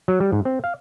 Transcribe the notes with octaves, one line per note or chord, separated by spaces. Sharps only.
F#3
G3
G#2
C4
F5